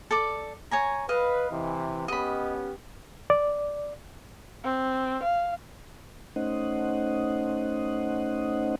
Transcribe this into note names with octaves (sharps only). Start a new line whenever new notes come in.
A4 D5 D6
C#5 G#5 A#5
B4 D#5 F5
C3 E3
B3 C#4 G4 D#5 B5
D5
C4
F5
A3 C#4 D#4 C5 D#5 F#5